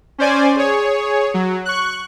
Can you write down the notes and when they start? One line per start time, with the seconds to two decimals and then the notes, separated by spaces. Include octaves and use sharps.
0.18 C#4 C5 D5 G#5
0.56 G#4 C#5
1.34 F#3
1.65 C#6 F#6